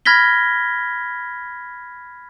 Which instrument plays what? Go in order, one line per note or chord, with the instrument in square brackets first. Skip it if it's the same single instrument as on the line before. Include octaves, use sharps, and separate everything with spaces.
[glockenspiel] B5 F6 G#6 A#6 B6 G7